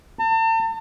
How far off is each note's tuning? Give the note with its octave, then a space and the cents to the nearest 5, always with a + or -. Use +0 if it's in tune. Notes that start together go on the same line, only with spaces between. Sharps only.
A5 +40